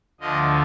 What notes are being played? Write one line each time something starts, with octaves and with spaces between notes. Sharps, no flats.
D2 D3 F3 D#5